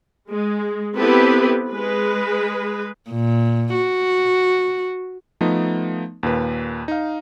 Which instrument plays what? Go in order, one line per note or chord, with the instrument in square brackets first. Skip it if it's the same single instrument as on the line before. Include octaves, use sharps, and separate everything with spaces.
[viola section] G#3
B3 C4 E4 G4 A4 B4
G#3 B4
[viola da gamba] A#2
F#4
[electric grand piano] F3 A3 B3 D#4
D#2 A#2 B4
D#4 F5